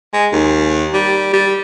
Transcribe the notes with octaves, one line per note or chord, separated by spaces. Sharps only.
G#3
D#2
G3
G3